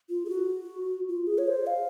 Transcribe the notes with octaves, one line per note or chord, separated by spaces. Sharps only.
F4
G#4
F#4
F4
G#4
C#5
C5
F5